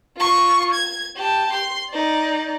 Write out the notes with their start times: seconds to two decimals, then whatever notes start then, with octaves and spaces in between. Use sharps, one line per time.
0.17 F4 C#6
0.74 G#6
1.16 G4 A5
1.53 C6
1.90 D#4 D5